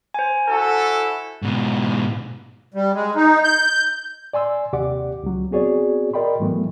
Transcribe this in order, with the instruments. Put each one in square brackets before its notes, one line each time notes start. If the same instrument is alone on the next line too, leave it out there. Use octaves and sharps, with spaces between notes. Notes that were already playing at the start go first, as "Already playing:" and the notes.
[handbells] C5 G#5
[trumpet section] E4 F#4 A4
[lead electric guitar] G#2 B2
[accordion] G3
G#3
D#4
G6
[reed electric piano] D5 G#5 C6 E6
D#2 C3 G4 D5 F#5 D6
C#2 F#3
B3 C4 F#4 G#4 C#5 D5
A#4 D5 D#5 G5 B5 C6
G#2 E3 F#3 A3 B3